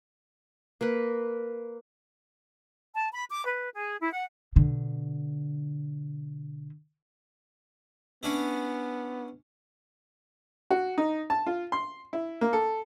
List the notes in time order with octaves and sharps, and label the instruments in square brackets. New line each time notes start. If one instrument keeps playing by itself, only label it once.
[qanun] A#3 A#4 B4
[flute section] A5
B5
D6
B4
G#4
E4
F#5
[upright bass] B2 D3
[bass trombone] B3 [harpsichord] C#4 D4 E4
[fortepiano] F#4
D#4
A5
F4
C6
E4
A#3
A4